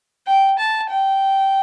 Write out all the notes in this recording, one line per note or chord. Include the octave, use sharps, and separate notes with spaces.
G5
A5
G5